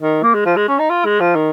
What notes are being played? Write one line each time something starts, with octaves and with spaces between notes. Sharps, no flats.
D#3
A#3
G#3
F3
G#3
C#4
D#4
F4
G#3
F3
D#3